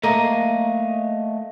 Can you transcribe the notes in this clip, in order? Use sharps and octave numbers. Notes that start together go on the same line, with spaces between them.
A3 A#3 D#5